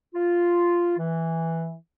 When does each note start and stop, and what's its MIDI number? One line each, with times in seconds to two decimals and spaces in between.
0.15 0.96 65
0.98 1.74 52